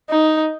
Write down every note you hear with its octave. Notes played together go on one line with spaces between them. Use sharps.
D#4